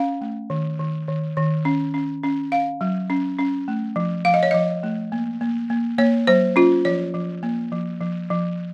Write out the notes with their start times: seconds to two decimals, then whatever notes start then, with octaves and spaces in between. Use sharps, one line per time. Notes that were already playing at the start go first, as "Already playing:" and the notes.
Already playing: C#4 F5
0.21 A3
0.50 D#3
0.79 D#3
1.08 D#3
1.37 D#3
1.65 C#4
1.94 C#4
2.23 C#4
2.52 C#4 F5
2.81 F#3
3.10 C#4
3.39 C#4
3.68 A3
3.96 F3
4.25 F3 F5
4.34 D#5
4.43 C#5
4.51 F3 D#5
4.83 A3
5.12 A#3
5.41 A#3
5.70 A#3
5.98 A#3 C#5
6.27 F#3 C5
6.56 C#4 F4
6.85 F3 C#5
7.14 F3
7.43 A#3
7.72 F3
8.01 F3
8.30 F3